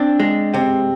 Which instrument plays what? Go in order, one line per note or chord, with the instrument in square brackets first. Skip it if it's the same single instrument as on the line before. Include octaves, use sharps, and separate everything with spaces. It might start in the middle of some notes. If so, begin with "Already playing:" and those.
Already playing: [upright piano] C4 [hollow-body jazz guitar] D4
[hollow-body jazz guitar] G#3
[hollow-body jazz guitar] C3 [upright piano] C4